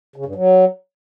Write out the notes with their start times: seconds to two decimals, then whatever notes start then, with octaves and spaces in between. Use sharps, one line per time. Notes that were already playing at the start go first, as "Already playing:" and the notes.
0.16 C#3
0.26 G2
0.35 F#3